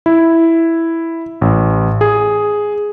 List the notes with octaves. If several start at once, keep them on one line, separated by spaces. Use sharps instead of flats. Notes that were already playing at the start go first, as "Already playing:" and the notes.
E4
A1
G#4